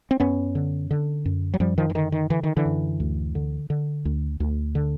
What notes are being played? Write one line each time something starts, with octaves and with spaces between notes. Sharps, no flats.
C4
F#2 B3 C#4
D3
D3
F#2
F#3
F#2 F3 G3
D#3 F3
E3
D3 D#3
D#3
D3 E3
D#3
D3 E3
F#2
D2
D3
D3
D2
D2
D3